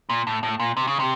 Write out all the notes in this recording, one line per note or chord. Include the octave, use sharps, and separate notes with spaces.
A#2
A2
A2
A#2
C3
C#3
C3